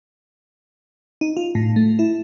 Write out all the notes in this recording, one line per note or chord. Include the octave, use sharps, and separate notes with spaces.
D#4
F4
A2
A3
E4